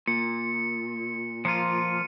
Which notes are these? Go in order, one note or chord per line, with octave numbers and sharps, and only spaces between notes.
A#2 C#7
F3 A#3 F4 C#7 D#7